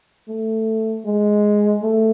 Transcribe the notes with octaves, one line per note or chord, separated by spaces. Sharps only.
A3
G#3
A3